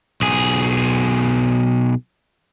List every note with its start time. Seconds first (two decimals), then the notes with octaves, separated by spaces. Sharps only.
0.22 B1 G#4